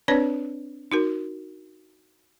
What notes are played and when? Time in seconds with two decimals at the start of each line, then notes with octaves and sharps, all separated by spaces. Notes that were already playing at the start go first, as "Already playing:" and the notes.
0.08 C4 D4 B4 C#5 D5
0.92 D#4 F#4 A#4